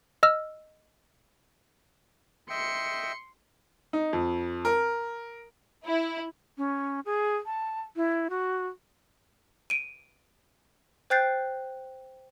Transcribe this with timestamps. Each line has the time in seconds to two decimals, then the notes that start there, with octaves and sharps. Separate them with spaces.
0.23 D#5 E6 F6
2.50 D#5 E5 G5 C6 C#7
3.93 D#4
4.13 F2
4.65 A#4
5.84 E4
6.58 C#4
7.06 G#4
7.46 A5
7.96 E4
8.30 F#4
9.70 D7 D#7
11.10 C5 G5 F#6 G6 A6 C7